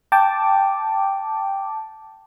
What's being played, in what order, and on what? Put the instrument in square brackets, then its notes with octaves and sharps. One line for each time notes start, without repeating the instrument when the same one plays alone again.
[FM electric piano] G5 A5 D6